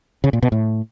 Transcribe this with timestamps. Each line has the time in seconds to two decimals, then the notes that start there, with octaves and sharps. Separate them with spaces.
0.24 C#3
0.33 A#2
0.42 B2
0.52 A2